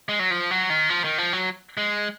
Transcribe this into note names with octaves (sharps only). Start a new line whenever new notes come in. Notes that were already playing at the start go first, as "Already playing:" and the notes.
G#3
F#3
F3
F#3
D#3
F3
D#3
F3
F#3
G#3